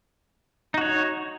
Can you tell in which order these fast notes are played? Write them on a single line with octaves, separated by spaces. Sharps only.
D#4 F#4 C#5